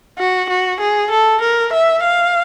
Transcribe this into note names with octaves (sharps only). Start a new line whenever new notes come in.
F#4
F#4
G#4
A4
A#4
E5
F5